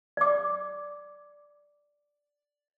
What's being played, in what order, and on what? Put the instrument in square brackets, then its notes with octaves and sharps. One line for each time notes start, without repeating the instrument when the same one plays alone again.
[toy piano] D5 D6